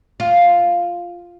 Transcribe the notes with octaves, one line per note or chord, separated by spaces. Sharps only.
F4